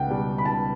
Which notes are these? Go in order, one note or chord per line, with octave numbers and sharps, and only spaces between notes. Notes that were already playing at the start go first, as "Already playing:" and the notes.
Already playing: C#2 F#5 G5
B2 G3
B5
C#2 A5